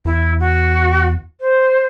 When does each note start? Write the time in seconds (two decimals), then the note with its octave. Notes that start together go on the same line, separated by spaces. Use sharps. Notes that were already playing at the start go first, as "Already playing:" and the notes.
0.05 E2 E4
0.40 F#4
1.40 C5